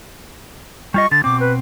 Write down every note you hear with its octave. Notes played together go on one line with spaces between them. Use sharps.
G3 F4 D#5 C#6
D3 A6
B2 C4 D6
B4